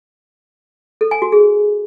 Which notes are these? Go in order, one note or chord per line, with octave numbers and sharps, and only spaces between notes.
A4
G#5
F#4
G#4